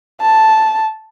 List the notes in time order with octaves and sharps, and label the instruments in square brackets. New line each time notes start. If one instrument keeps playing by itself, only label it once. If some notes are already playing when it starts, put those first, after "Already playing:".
[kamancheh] A5